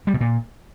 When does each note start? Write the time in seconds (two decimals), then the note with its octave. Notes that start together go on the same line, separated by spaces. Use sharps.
0.07 G3
0.14 B2
0.21 A#2